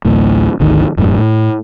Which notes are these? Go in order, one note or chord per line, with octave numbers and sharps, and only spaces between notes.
A1 D2 A2
G#1 D2 D#3
E1 F#2 A2
A2